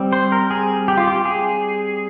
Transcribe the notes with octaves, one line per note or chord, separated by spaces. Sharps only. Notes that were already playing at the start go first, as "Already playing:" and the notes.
Already playing: G3 C4
C5
A#4
G#4
G4
F4
G4
G#4